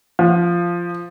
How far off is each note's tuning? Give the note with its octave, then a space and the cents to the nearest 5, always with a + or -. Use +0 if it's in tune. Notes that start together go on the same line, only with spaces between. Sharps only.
F3 -10